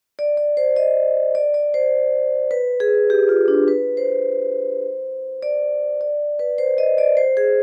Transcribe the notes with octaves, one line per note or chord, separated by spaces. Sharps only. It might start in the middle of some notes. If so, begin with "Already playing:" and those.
D5
D5
C5
D#5
D5
D5
C5
B4
G#4
G4
F4
D4
B4
C5
D5
D5
B4
C5
D#5
D5
C5
G#4